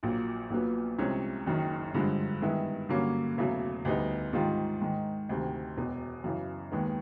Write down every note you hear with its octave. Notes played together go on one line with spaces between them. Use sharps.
A#1 A#2 F#3 A#3
A#1 A#2 F#3 B3
C2 C3 F3 G#3 C#4
F#1 F#2 D#3
G2 D3 F3 G#3
G2 D#3 G#3 B3 E4
G2 D3 F#3 A#3 C#4
E1 E2 C#3 F#3 A3
D2 D3 G3 B3 D#4
G#2 D#3 G3 C4 F4
G#2 D#3 G#3
D2 C3 D#3
E1 E2 B2
F#2 C#3 E3
D#2 D#3 G#3 B3